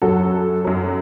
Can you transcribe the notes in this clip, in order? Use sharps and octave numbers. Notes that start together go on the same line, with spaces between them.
F#2 F#3 F#4 A4
F#2 F#3